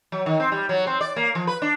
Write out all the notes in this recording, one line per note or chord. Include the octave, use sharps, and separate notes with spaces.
F#3
D#3
C4
G3
F#3
C4
D5
A#3
F3
B4
D4